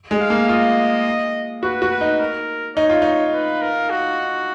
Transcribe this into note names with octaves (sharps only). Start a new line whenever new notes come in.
G#3
F5
A#3
F4 D#5
F#4 B4
F#4
B4
D#4
A#4
D#4 C#5
F4
D#4
B4
A#4
F#4